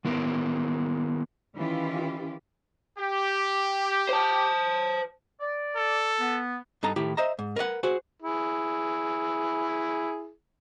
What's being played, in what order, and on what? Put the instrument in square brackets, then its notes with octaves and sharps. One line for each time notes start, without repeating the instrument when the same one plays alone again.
[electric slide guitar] D#3 B3 E4 A#4
[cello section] D#3 E3 C#4 E4 F4 G4
[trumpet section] G4
[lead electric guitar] C5 A5
[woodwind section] D5
[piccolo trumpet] A4
[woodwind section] B3
[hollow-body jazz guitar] G2 D#4 A4 A5 A#5
A2 D#3 E4 G4
C5 D#5 E5 A#5
G#2
A#4 B4 D5 F#5
F#4 G#4 C5
[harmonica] E4 G#4